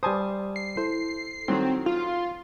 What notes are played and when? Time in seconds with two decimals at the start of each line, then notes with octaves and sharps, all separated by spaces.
0.03 G3 C5 G#5 A5 D#6
0.56 C7
0.77 E4 A4 C5
1.48 D#3 F#3 C4
1.86 F4